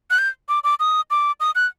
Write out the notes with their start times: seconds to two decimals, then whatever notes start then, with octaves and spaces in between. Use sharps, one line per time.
0.10 F#6
0.18 G6
0.49 D6
0.64 D6
0.80 D#6
1.10 D6
1.40 D#6
1.55 F#6